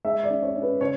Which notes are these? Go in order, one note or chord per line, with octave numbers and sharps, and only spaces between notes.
G#3 E5
D5
C#4
C#5
C#4
B4
C#3 C#5